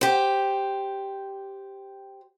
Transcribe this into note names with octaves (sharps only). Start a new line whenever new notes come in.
G4 C5